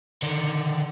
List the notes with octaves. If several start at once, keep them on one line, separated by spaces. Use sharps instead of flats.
D3 D#3